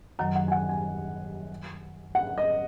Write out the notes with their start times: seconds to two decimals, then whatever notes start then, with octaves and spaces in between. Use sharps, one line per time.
0.19 F#2 D#3 F#3 F#5
0.36 F#5
0.48 G#5
0.52 F#5
0.69 G#5
2.15 F#5
2.38 D#5